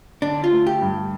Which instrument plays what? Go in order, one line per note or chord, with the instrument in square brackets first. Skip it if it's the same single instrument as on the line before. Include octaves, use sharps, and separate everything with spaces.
[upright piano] D3 [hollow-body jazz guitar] D4
[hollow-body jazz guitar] F4
[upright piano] A3
[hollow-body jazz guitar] G4
[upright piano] G2